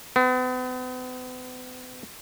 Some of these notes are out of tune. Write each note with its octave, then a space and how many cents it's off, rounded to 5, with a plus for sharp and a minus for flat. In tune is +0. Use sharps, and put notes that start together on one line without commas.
B3 +40